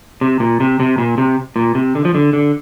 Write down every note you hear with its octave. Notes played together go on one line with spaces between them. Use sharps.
C3
A#2
C3
C3
A#2
C3
A#2
C3
D3
F3
D3
D3